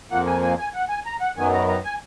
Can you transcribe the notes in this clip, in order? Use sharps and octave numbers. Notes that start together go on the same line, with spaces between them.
F2 F3 A#3 F#5
G#5
G#5
G#5
F#5
G#5
A#5
F#5
F#2 D#3 F#3 B3 G#5
A#5
A#5
G#5